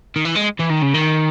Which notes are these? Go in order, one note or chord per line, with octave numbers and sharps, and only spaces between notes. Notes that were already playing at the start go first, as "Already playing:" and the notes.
D#3
E3
G#3
E3
D#3
C#3
D#3